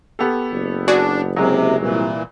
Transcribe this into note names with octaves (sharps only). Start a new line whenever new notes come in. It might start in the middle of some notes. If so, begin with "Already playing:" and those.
B3 G4 A4
F#1
D4 F#4 G#4 D5
C3 F#3 G#3
C2 A#2 E3